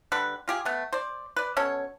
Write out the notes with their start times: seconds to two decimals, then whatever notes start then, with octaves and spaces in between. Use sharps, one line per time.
0.12 D3 G3 B4
0.48 F4 G4 G#4
0.65 A3 B3
0.93 C5 D5
1.36 B4 D5
1.56 B2 C#4 A4 C#5